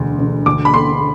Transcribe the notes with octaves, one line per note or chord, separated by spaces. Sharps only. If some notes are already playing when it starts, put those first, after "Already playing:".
Already playing: E1 D2
E1
D2 D6
B5
D3 C6